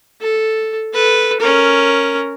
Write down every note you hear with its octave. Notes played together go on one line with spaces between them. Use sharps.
A4
A4 B4
C#4 A#4